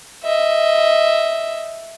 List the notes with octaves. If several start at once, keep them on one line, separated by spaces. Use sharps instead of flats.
D#5 E5